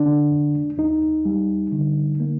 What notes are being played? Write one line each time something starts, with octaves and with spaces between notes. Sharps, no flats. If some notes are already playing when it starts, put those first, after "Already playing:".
Already playing: D3 D4
F2
D#2 D#4
G3
D3
A#3